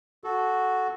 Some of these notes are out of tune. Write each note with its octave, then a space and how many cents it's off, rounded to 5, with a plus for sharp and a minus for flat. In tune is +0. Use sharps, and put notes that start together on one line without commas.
F#4 +0 A4 -15